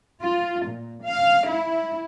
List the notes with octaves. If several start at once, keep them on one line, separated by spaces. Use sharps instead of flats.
F4
A#2
F5
E4